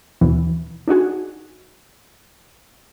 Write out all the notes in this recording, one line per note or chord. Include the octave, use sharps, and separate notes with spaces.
D#2 B2 E3
D4 D#4 F#4 G#4